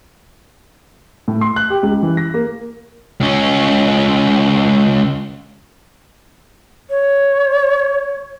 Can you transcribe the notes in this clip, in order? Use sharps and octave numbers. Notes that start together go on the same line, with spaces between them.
A2
C6
F#6
G4
C#2
E3
A#6
A#3
C#2 C#4
C#5